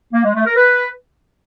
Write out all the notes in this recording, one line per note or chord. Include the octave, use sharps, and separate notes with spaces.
A#3
G#3
A3
A#4
B4